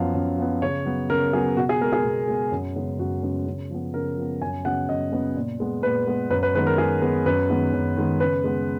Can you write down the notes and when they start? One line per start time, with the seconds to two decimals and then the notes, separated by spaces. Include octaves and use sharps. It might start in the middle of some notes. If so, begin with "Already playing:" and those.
Already playing: F#2 F3 B3 F5
0.14 F#2
0.38 F3 B3
0.62 C#3 C#5
0.85 F#3 B3
1.10 C#3 A#4
1.33 F#3 B3 G#4
1.57 B2 F#4
1.69 G#4
1.81 G#3 B3 A#4
1.93 G#4
2.04 B2
2.28 G#3 B3
2.52 F#2
2.76 C#3 G#3 B3
2.99 F#2 F#4
3.23 C#3 G#3 B3
3.47 C#3
3.70 F3 B3
3.94 C#3 A#4
4.18 F3 B3
4.41 F#2 G#5
4.65 C#3 F#3 B3 F#5
4.89 F#2 D#5
5.12 C#3 F#3 B3
5.36 A#2
5.60 G#3 B3
5.83 A#2 B4
6.07 G#3 B3
6.30 F#2 B4
6.43 B4
6.54 D#3 G#3 B3 B4
6.67 A#4
6.78 F#2 G#4
7.02 D#3 G#3 B3
7.26 F#2 B4
7.50 D#3 G#3 B3
7.73 F#2
7.97 D#3 G#3 B3
8.20 C#3 B4
8.44 G#3 B3